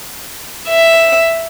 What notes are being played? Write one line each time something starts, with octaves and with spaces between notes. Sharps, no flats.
E5